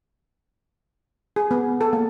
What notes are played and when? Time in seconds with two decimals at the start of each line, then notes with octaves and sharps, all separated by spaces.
1.36 G#4
1.51 B3
1.81 A4
1.93 A#3